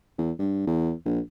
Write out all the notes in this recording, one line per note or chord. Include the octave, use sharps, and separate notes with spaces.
E2
G2
E2
A#1